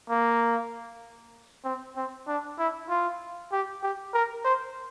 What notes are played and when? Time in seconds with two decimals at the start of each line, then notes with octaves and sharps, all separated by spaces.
0.09 A#3
1.65 C4
1.96 C4
2.27 D4
2.59 E4
2.89 F4
3.52 G4
3.83 G4
4.13 A#4
4.45 C5